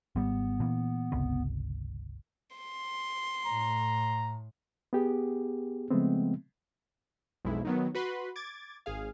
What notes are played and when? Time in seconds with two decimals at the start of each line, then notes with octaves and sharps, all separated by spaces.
0.15 G#1 G3 B3
0.60 A#2 E3
1.12 G1 C#2 C3
2.56 C6
3.46 A2 A#5
4.93 B3 G4 G#4
5.90 C#3 F3 G#3 A3 B3 C4
7.45 B1 F2 G#3 E4
7.65 D#3 F#3 B3
7.95 F#4 B4 B5 C6
8.36 D6 G#6 A6
8.86 G#1 G#4 F5